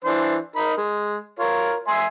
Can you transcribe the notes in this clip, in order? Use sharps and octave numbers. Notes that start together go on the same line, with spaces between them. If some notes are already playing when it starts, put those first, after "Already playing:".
E3 D4 C5
D#4 A#4 B5
G#3
F4 A#4 C#5
E5 G#5 C6